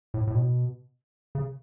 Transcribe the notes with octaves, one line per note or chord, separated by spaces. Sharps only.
A2
A2
B2
C#3